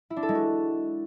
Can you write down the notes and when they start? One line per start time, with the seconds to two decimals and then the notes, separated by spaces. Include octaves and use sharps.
0.10 E4
0.17 D4
0.23 A4
0.29 G#3
0.35 F#4